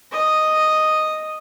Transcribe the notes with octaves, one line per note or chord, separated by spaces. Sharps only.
D#5